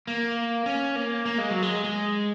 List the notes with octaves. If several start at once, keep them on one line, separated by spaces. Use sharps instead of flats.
A#3
C#4
A#3
A#3
G#3
F#3
G#3
G#3